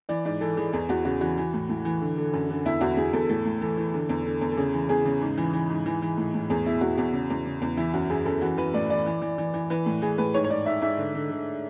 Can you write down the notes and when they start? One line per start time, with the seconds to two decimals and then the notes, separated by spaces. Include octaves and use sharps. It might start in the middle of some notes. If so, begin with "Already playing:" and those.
0.09 E3 D5
0.25 G#2 D5
0.41 E3 A4
0.57 E3 G#4
0.73 E2 G#4
0.89 E2 F#4
1.05 C#3 F#4
1.21 E3 F#4
1.38 E3
1.54 A2
1.69 A2
1.85 E3
2.02 D3
2.17 D3
2.33 F#2
2.50 D3
2.65 E2 E4
2.81 E2 F#4
2.97 E2 G#4
3.13 E2 A4
3.29 A2 A4
3.45 A2
3.61 E3 A4
3.77 E3
3.94 D3
4.09 E2
4.25 D3
4.41 E2
4.52 A4
4.57 C#3 G#4
4.73 E3
4.89 E2 G#4
5.05 C#3
5.22 G#2
5.38 E3
5.53 E3
5.70 G#2
5.86 E3
6.02 E3
6.18 A2
6.34 A2
6.50 E2 G#4
6.66 B2 E4
6.81 E2 F#4
6.97 E2 F#4
7.13 C#3
7.30 E2
7.46 C#3
7.62 E2
7.77 E3 E4
7.94 F#2 F#4
8.10 F#2 G#4
8.25 F#2 A4
8.41 E3 F#4
8.57 E3 B4
8.74 A2 D5
8.90 E3 D5
9.06 E3
9.22 E3
9.38 E3
9.54 E3
9.70 E3 B4
9.86 A2
10.02 E3 G#4
10.18 A2 B4
10.34 G#2 C#5
10.44 C#5
10.50 G#2 D5
10.66 G#2 E5
10.82 G#2 E5
10.98 D3
11.15 D3
11.30 D3